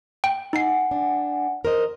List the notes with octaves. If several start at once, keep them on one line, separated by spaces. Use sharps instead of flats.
G5
D#4 F#5 G#5 C7
D4
A#4 C5 D#5